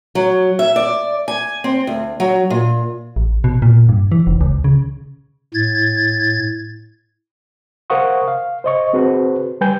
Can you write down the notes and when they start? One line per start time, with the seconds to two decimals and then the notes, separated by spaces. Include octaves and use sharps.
0.15 F#3
0.59 E5
0.76 D5
1.28 G#5
1.64 C4
1.87 D2
2.20 F#3
2.50 A#2
3.16 A1
3.44 B2
3.62 A#2
3.89 G2
4.12 E3
4.27 F1
4.41 C#2
4.64 C#3
5.54 A2 G#6 A6
7.90 A#4 C5 F5 F#5 C#6 D#6
8.28 F5
8.64 C5 D#5 C#6
8.93 C4 F#4 G#4 B4 C5
9.61 G3 B4 G5 G#5 G6